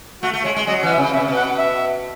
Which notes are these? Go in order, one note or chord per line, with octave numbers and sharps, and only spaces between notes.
A3 F#4
A3
G#3 C#5
G#3
F#3 D#5
E3 F#5
E5
C#3
B2 E5
C#3
B2
F#5
E5